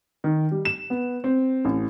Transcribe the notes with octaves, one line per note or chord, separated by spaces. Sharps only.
D#3
G3
E7
B3
C4
A1